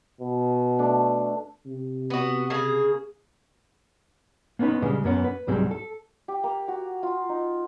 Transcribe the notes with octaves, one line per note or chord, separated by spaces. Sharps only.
B2
A3 D4
C3
B3 F#4
C#3 A#3 G#4
A#3 B3 C#4 D#4 B4
A#2 C#3 G3 G#3 D4
F#2 A#3 B3 C#4
B4
C2 G#2 F#3 G3 C4 G#4
A4
G4
A#3
F#4
F4
D#4